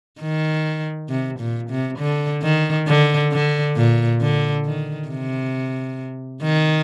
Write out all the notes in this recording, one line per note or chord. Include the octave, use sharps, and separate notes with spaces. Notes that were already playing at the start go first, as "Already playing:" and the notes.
D#3
C3
A#2
C3
D3
D#3
D3
D3
A#2
D3
D#3
C3
D#3